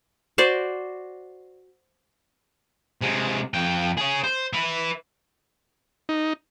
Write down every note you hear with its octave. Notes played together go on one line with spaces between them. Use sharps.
F#4 C5 D5
C3 G#3
F2 G5
G#4 C#5
C5
B4 E5
D#4